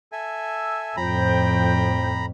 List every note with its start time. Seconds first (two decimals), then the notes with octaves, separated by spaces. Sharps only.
0.12 A4 E5 G#5
0.97 F2 A2 F3 C5 G5 A#5 B5